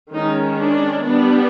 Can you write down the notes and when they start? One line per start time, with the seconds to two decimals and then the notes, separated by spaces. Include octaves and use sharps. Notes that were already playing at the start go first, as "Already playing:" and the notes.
0.14 D#3 G#3 C#4 D#4
0.59 D4
1.03 G3 B3 D4